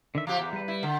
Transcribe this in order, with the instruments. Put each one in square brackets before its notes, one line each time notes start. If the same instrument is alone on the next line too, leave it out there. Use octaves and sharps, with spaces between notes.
[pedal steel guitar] D3 D#3 E5
[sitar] F3 G4 [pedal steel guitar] A#5 D6
[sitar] E2
[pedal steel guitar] G3 B4
[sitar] E4
D3